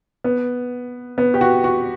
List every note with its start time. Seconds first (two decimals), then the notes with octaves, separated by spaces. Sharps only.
0.24 B3
1.18 B3
1.34 G4
1.41 F#4
1.64 F#4